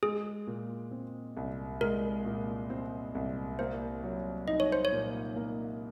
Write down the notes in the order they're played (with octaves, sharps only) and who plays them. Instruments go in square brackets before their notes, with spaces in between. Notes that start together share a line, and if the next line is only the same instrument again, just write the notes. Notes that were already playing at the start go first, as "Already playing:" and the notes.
[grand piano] G#3 [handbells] G#4
[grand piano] A#2
C4
C2
[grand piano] G#3 [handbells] A#4
[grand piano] A#2
C4
C2
[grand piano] A#3 [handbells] C5
[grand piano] F#3
[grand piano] D#4 [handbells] D#5
[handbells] C#5
C5
C#5
[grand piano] A#2
A#3